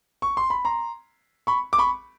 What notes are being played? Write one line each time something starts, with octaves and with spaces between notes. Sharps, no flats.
C#6
C6
B5
A#5 C6
B5 C#6
D6
B5 C#6